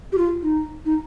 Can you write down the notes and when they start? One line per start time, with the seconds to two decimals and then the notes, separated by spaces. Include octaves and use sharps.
0.12 G4
0.17 F4
0.43 D#4
0.85 D#4